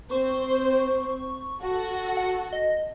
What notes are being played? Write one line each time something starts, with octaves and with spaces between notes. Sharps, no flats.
C4 C5 C#6
F#4 A4
F#5
D#5